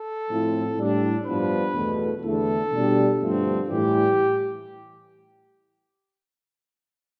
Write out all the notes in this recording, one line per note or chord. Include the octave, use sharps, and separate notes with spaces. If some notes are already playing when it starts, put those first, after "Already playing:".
Already playing: A4
A2 F3 C4 E4
A2 G3 D4
G2 F3 B3 D4 B4
E2 B2 A3
E2 D3 A3 A4
B2 G3 D4
G2 D3 F3 A3 C4
A2 E3 G3 G4